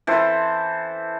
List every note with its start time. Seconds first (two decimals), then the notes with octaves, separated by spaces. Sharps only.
0.07 E3 A4 C5